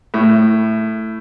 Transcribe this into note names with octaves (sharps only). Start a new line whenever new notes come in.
A2